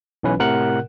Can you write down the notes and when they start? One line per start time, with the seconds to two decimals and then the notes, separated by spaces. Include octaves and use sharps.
0.23 B1 E3 C#4 B4
0.39 A2 C3 A#4 F#5 F#6